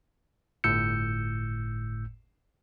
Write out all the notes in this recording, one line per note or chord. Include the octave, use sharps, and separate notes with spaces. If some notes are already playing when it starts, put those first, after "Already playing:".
G1 A2 E6 G6 C#7